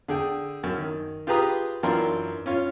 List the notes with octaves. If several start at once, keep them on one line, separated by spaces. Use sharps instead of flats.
D3 G#4 G5
F#2
D#3
F4 G4 G#4 B4 A#5 D#6
F#2 E3 D4 F4 A#4 C6
C#4 F4 C#5